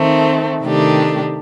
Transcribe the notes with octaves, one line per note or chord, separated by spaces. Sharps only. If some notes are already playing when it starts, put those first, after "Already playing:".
Already playing: D#3 A3 C4
C3 D#3 A3 D4 G4